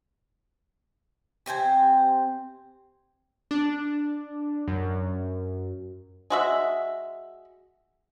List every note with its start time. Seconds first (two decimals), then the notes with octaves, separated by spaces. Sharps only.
1.46 C3 C4 C5 G#5
3.51 D4
4.68 F#2
6.30 G#3 F#4 E5